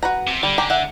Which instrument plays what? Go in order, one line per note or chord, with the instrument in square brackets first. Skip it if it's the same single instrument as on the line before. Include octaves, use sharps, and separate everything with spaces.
[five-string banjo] F#4 B4 A#5
[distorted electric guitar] C3
[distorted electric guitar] D3 [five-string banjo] G3
[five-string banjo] G4 G#5 A#5
E5 F#5